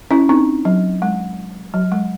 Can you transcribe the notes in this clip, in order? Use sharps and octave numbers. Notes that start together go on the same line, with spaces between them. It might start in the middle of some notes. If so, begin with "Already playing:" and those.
C#4 E4
C4 D#4
F#3
G#3
F#3
G#3